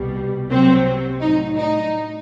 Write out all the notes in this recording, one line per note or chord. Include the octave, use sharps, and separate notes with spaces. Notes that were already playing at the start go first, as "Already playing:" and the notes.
Already playing: C2 B2 G3
C2 C3 F#3 C4
A2 F#3 D#4
D#4